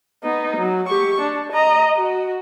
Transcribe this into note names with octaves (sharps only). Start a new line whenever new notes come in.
B3 D#4
F#3
G4 C#6
D4
D#5 A#5
F#4